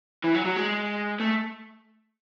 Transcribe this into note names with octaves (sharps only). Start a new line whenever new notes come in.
E3
F#3
F#3
G#3
A3